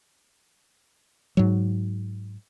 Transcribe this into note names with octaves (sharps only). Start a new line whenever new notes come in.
G#2 F#3